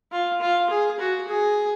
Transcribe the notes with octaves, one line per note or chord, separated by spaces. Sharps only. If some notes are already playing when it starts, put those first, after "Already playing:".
F4
F4
G#4
F#4
G#4